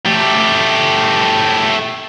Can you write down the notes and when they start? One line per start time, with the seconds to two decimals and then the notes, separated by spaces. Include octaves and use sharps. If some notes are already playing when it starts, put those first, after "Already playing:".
0.06 A3 G4